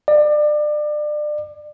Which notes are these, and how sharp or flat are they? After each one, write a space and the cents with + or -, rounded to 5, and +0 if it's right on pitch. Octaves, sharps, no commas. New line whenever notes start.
D5 +30